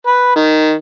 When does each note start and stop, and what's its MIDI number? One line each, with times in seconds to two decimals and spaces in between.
0.06 0.32 71
0.36 0.73 51